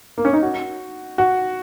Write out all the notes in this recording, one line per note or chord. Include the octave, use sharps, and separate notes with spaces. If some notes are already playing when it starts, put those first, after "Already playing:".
A#3
C#4
D#4
F#4
F#4